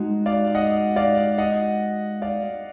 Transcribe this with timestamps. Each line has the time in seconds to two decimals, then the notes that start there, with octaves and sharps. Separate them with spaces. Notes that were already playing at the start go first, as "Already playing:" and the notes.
Already playing: G#3 D#4 F#4
0.26 D5 F5
0.55 D#5 F#5
0.96 D5 F5
1.38 D#5 F#5
2.22 D5 F5